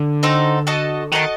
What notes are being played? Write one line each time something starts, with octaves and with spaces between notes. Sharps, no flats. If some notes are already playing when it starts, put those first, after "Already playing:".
Already playing: D3
C4 D#4 F#4 A4
F#4 A4 D#5 A5
D#3 F#4 A4 D#5 A5